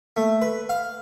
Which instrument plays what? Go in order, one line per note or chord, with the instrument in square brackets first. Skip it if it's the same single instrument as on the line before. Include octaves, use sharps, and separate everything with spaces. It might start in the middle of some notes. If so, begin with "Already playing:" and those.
[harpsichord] A3
B4
F5